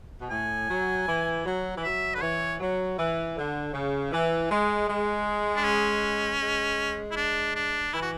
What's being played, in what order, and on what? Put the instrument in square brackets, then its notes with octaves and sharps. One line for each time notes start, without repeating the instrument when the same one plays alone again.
[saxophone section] B2
[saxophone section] A2 [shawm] G#5
[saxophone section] F#3
E3
F#3
E3
[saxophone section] F#3 [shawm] E5
[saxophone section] D3 [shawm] B4
[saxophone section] E3 [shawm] C#5
[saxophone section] F#3
E3
D3
C#3
E3
G#3
G#3
[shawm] D4
C#4
[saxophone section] G#3
[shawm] E4
D4
D4
[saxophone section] E3 [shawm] E4
[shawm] F#4